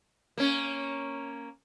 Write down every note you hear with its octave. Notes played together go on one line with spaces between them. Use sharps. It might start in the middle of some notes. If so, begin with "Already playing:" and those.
A#3 C#4